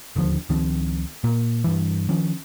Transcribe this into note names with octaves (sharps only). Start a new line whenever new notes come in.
D1 D#2 D3 F3
C#2 D#3 F3 C4
A#2 A#3
G2 E3
D#3 F3 C#4